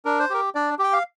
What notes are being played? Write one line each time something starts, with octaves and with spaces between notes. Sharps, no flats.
D4 A#4
C5
G4 A#4
D4 D5
G4 G5
F5